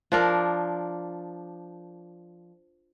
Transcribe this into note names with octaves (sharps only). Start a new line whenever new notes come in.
F3 D4 A#4